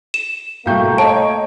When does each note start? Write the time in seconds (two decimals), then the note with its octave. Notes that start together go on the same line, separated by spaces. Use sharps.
0.14 E7
0.66 C2 B2 A3 A#3 F5 G5 C#6 G6
0.98 C#5 D#5 A5